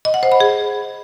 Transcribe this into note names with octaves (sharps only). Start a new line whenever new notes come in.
D#5
F#5
C5
B5
G#4